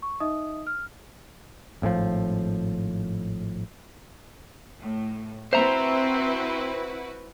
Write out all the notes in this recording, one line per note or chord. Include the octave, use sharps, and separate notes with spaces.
C#6
D#4 D#5 E5 D#6
F6
G#1 A2 C3 F3
A2
C4 E4 F#4 B4 C5 E5 A#5